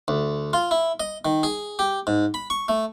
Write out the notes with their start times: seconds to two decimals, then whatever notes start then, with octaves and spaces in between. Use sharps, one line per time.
0.08 D2
0.53 F4
0.71 E4
1.00 D#5
1.25 D#3
1.43 G#4
1.79 G4
2.07 G#2
2.34 B5
2.50 C#6
2.68 A3